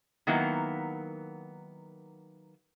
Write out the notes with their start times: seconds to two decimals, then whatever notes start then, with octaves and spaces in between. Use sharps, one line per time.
0.27 D#3 F#3 A#3 B3 E4